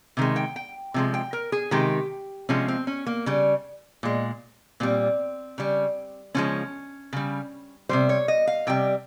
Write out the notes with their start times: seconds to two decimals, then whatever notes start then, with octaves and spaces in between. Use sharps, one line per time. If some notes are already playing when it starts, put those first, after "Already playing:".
0.17 C3 D#3 G#3
0.36 G5
0.56 G5
0.94 C3 F3 G#3
1.14 G5
1.33 A#4
1.52 G#4
1.71 C3 D#3 G#3 G4
2.49 C3 F3 G#3 C#4
2.68 C4
2.87 C#4
3.06 A#3
3.26 C#3 G3
4.03 A#2 G#3
4.80 A#2 G3 C4
5.58 C#3 G3
6.35 C#3 F3 G#3 C#4
7.13 C#3 G3
7.89 C3 D#3 G3 C5
8.09 C#5
8.28 D#5
8.47 F5
8.67 C3 G3 G5